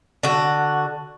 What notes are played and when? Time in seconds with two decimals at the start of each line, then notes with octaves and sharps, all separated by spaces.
0.23 D3 F#4